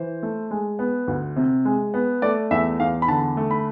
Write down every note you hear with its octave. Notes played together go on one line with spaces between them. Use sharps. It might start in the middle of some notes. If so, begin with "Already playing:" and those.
Already playing: E3 C5
A3
G#3
B3
D2
C3
G#3
B3
A3 D5
E2 E5
E2 F5
B5
D3 A5
A3
B5